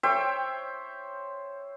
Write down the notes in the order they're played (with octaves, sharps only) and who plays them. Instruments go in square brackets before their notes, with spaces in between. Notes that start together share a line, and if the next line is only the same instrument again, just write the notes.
[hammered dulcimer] C5 C#5 E5 G5